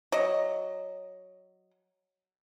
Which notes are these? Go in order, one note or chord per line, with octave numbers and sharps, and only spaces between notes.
F#3 D#5